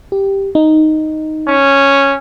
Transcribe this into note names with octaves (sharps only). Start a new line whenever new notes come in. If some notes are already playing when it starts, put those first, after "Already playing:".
G4
D#4
C#4